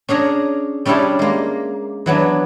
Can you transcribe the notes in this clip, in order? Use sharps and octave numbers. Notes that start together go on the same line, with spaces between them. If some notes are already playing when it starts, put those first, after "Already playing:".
C#4 D4 G#4 A#5
G3 C#4 D4 E4 G4 G#4
G#3 A#3
E3 F#3 B3 D4